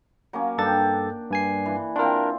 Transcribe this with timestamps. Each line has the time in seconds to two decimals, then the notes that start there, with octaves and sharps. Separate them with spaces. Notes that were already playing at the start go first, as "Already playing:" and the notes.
0.33 F#3 A#3 C#4
0.58 G2 D4 A4 G5 A6
1.30 G2 G#5 C7
1.66 E3
1.96 C4 D4 F4 A#4